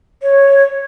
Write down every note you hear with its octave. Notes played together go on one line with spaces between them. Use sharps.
C#5